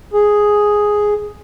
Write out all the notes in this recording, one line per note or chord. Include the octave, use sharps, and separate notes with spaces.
G#4